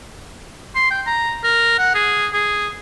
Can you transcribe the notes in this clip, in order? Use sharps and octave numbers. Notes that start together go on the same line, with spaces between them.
C6
G5
A#5
A#4
F#5
G#4
G#4